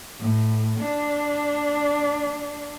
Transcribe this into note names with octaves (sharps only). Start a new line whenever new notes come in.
A2
D4